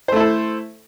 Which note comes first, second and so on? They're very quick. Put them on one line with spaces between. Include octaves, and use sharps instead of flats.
C5 A3 E4 A4